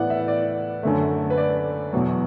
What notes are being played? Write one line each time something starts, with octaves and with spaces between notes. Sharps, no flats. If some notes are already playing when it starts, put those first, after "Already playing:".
Already playing: A2 E3 B3 D5 F#5
E5
D5
F#2 D3 A3
B4
D5
E2 B2 F#3